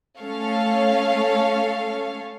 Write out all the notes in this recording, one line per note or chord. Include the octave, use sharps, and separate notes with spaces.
A3 C#4 A4 C#5 F5